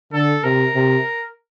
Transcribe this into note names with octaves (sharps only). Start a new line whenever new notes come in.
D3 A4
C3 A#4
C3